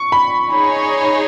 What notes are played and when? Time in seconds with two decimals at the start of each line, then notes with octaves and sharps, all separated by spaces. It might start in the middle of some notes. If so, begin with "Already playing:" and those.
Already playing: C#6
0.12 B5
0.50 D#4 G#4 C#5